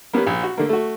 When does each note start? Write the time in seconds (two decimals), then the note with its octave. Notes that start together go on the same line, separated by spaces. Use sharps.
0.13 A#3 B3 C#4 G4 B4
0.26 A#1
0.43 F#4
0.57 D3 A3 A#3
0.69 A3 F#4